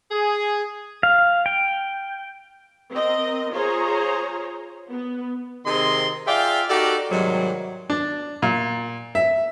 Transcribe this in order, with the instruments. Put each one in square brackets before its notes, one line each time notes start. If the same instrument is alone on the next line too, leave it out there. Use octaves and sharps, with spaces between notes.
[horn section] G#4
[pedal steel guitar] F5
G5
[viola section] C4 A#4 D#5
F4 G#4 C5 C#5 A#5
B3
[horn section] C3 D#3 C4 G#4 D#5 C6
F4 G#4 D5 E5 F5 G5
D#4 F#4 G4 A4 A#4 D5
G#2 C3 D#3 F#3 G3
[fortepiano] D4
A#2
E5